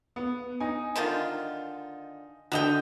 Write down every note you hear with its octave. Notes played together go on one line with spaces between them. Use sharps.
B3
D#4 G#5
D3 D#3 F4
D3 F#4 A4 D#5 G5 F7